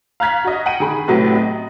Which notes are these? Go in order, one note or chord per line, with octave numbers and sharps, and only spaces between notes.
F5 A#5 F#6 G#6 B6
F#4 D#5
F#5 G5 D#7
D#3 G#4 B5
A2 C3 F#3 B3
D#5